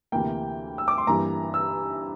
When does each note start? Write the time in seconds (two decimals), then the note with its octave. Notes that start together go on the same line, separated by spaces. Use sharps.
0.12 D2 C3 E3 A#3 G5
0.78 E6
0.88 D6
0.98 C6
1.07 G2 E3 A#3 A#5
1.54 E6